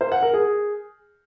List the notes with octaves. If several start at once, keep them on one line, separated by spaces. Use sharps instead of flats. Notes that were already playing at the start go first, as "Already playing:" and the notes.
C5
F#5
A#4
G#4